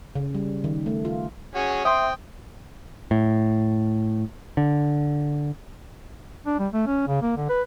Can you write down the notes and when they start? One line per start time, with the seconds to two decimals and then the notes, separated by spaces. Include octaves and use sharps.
0.15 C#3
0.35 G3
0.64 D#3
0.86 A3
1.05 F4
1.55 C#4 F#4 G#4
1.85 C5 E5 G5 C6 D#6
3.11 A2
4.57 D3
6.46 D4
6.59 G3
6.73 A3
6.86 C#4
7.07 C#3
7.22 A#3
7.36 D3
7.49 B4